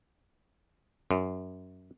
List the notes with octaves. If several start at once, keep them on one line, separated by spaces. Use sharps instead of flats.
F#2